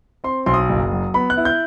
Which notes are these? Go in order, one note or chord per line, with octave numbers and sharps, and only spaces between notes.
C4 C6
B1 C6
D#6
F#1
F#3
B3 B5
F#6
E4
G6